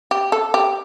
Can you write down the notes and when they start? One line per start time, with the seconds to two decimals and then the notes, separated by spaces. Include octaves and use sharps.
0.11 G4
0.32 A4
0.54 G4